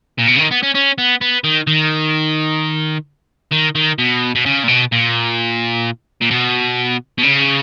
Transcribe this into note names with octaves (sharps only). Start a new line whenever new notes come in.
A#2
B2
C#3
D#3
B3
C#4
C#4
B3
B3
D#3
D#3
D#3
D#3
B2
B2
C#3
A#2
B2
A#2
A#2
B2
B2
C#3